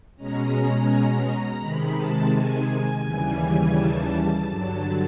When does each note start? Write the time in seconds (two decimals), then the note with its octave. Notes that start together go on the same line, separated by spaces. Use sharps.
0.17 B2 G#3 C#4 A#5
1.59 C3 D#3 G#3 B5
1.95 A5
2.31 G#5
3.02 D#2 C#3 E3 G3
3.75 A5
4.45 G2 D3 F#3